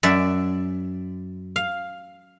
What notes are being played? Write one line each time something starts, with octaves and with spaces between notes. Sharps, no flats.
F#2 D5 E5
F5